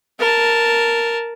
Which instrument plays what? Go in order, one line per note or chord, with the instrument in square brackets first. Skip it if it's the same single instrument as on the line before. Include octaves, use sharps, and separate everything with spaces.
[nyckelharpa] A#4 A5